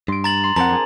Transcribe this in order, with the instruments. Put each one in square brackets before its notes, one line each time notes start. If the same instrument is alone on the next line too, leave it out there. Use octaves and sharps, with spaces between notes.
[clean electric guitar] G2 [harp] C6 D7
[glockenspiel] A#5 A6 F#7
[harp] C6
[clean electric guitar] F2 F#5 [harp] C4 A#4 A5 [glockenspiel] A#5
[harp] D4 G#4